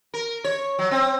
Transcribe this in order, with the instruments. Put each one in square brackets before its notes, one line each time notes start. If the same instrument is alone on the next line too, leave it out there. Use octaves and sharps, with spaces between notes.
[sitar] A#4
C#5
F#3
C4